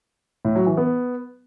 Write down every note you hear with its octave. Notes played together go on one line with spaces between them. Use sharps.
A2
F#3
E3
B3